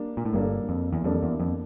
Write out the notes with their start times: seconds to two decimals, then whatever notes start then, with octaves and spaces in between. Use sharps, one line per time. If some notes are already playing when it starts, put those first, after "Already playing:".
Already playing: G3 A#3 D4
0.17 A#2
0.25 A2
0.33 G1 G2 G3 A#3 D4 A4
0.69 F2
0.93 E2
1.04 F2 G3 A#3 D4 A4
1.23 E2
1.40 F2